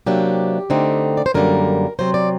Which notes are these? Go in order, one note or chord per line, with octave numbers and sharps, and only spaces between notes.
C3 F#3 A#3 D4 G4
D3 A3 C4 D#4
D5
C5
F#2 D3 G3 A#3 A#4
C3 F#3 C4 C5
D5